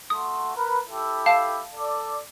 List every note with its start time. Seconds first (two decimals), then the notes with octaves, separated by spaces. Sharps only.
0.10 A3 F#4 C6 D#6
0.55 A#4 B4
0.89 E4 G4 A4
1.26 F5 A5 C7
1.73 A4 D5